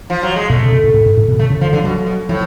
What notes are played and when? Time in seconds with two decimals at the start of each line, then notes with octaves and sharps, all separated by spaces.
0.10 F3
0.23 F#3
0.36 G#3
0.49 B2 A3
0.62 C#3
0.72 B2
0.84 A2
0.94 A2
1.06 G#2
1.17 A2
1.28 B2
1.39 C#3 A3
1.50 C#3
1.61 D3 F3
1.73 D3 F3
1.84 B2 F#3
2.06 B2
2.29 A2 F3